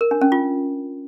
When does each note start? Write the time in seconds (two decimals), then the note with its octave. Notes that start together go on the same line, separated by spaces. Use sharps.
0.01 A#4
0.11 D4
0.21 C#4
0.32 F4